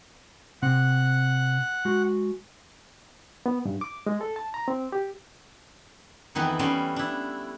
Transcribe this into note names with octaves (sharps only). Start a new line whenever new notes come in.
C3 C4 F#5 F#6
G#3 F#4
B3
G2
D6
G#3
A4
A5
A#5
C4
G4
F2 D#3 E3 B3 F#5
G3 A3 B3 C#4 D5 C6
D4 E4